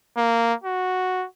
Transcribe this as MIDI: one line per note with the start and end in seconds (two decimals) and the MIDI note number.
0.17 0.54 58
0.64 1.26 66